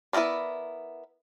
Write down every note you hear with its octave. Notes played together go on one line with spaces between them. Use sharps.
B3 E4 G#4 A#4 D5